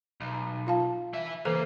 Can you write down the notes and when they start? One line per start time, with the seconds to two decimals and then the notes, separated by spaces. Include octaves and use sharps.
0.20 B1
0.67 F4 F5 A5
1.13 E3 E5
1.45 C#3 E3 A#3 A4 C5